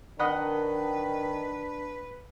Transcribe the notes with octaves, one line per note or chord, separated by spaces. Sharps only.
D#3 D4 B4 D#5 F#5 B5